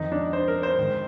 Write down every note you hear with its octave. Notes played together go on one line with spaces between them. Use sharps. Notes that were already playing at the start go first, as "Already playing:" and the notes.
Already playing: F2 D#3 D#4
D4
C5
A#4
C5
G#2 D#3